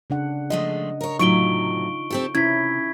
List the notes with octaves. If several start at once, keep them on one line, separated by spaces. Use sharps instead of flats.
C#3 D4 F#5
F3 G#3 A3 D#5
A#4 C#5
A2 C3 F#3 D#4 F4 C#6 D7 G7
C4 G4 A4
C3 C#4 E4 G#6 B6